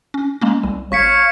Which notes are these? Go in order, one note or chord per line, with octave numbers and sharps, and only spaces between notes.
C#4
G#3 A#3 C#4
C2 G3
G#1 C#5 F5 C#6 B6 C#7